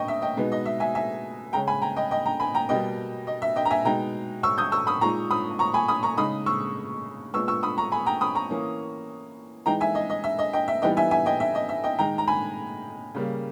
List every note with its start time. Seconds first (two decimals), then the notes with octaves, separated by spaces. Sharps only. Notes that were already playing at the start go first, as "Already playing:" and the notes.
Already playing: C#3 D#5 G5 C#6 D#6
0.08 E5
0.22 D#5 G5
0.37 B2 G#3 B3 D#4
0.52 D#5
0.66 E5
0.80 E5 G#5
0.95 E5 G#5
1.53 C#3 G#3 C#4 G5 A#5
1.67 G#5 B5
1.82 G5 A#5
1.96 D#5 G5
2.11 D#5 G5
2.26 G5 A#5
2.40 G#5 B5
2.54 G5 A#5
2.69 B2 G3 A#3 D#5 G5
3.27 D#5
3.42 E5
3.56 D#5 G5
3.65 A#5
3.71 E5 G#5
3.85 B2 G#3 D#4 G5 A#5
4.43 C#6 E6
4.58 D#6 G6
4.72 C#6 E6
4.87 B5 D#6
5.01 A#2 G#3 D#4 A#5 C#6
5.31 B5 D#6
5.59 A#5 C#6
5.74 G#5 B5
5.88 B5 D#6
6.03 A#5 C#6
6.17 C#3 G#3 D#4 B5 D#6
6.46 C#6 E6
7.34 A#2 G#3 B3 C#6 E6
7.48 C#6 E6
7.63 B5 D#6
7.78 A#5 C#6
7.92 G#5 B5
8.06 G5 A#5
8.21 B5 D#6
8.35 A#5 C#6
8.50 E3 A#3 C#4
9.66 E3 G#3 D#4 G5 A#5
9.81 E5 G#5
9.95 D#5
10.10 D#5
10.24 E5
10.39 D#5
10.53 D#5 G5
10.68 E5
10.82 E3 G3 B3 D#4 D#5 G5
10.97 E5 G#5
11.11 E5 G#5
11.26 D#5 G5
11.40 E5
11.55 D#5
11.69 E5
11.84 D#5 G5
11.99 D#3 G#3 D#4 G5 A#5
12.18 A#5
12.28 G#5 B5
13.15 C#3 G3 A#3